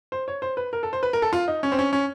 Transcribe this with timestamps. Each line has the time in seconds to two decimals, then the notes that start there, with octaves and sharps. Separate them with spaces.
0.12 C5
0.28 C#5
0.42 C5
0.57 B4
0.73 A#4
0.83 A4
0.93 C5
1.03 B4
1.13 A#4
1.22 A4
1.33 F4
1.48 D#4
1.63 C#4
1.72 C4
1.79 C#4
1.93 C#4